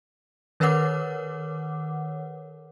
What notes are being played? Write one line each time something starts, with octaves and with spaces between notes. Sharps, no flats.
D#3 A#4 B4 C#5 F#5 D6